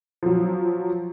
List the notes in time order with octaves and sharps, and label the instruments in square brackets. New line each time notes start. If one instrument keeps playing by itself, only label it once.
[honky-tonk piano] F3 F#3